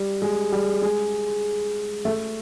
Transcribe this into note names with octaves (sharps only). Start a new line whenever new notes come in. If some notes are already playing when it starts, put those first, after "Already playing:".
Already playing: G3
G#3
G3
G#3
A3